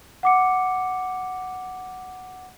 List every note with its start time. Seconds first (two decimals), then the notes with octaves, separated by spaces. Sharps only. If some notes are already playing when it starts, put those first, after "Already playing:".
0.23 F#5 D6 C#7